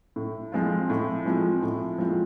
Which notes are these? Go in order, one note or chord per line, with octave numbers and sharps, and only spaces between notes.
A2
F3 G#3 C4 F4
A2
F3 G#3 C4 F4
A2
F3 G#3 C4 F4